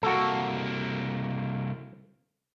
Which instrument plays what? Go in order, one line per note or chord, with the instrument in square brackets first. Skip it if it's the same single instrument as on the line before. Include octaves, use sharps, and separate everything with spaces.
[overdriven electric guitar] C2 A#3 [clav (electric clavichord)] F#4 A4